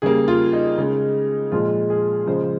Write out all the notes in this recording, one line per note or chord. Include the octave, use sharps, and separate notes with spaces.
C#3 G3 A#3 G#4
F4
D#4
C#3 G#3
A#2 F3 G#3 F4
G#4
C#3 F3 G#3 C5